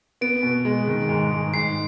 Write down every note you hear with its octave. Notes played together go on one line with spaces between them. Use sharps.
B3 D7
B2
G#3
D#3
G#2
G#2
G#2 C7